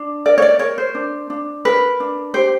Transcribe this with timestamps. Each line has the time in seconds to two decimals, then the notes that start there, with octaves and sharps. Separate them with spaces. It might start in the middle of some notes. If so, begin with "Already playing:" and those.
Already playing: D4
0.25 A#4 D5
0.38 C#5
0.42 D5
0.59 A#4 C#5
0.78 C5
0.95 D4
1.30 D4
1.65 A#4 B4
2.00 D4
2.34 G4 C5